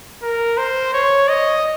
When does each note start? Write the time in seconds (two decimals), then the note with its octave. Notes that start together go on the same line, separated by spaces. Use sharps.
0.23 A#4
0.58 C5
0.93 C#5
1.29 D#5